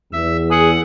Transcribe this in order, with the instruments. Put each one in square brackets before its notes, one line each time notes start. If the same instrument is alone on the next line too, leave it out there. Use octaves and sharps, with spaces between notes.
[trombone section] E2 [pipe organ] E5
[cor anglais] G#4 [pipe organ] F#5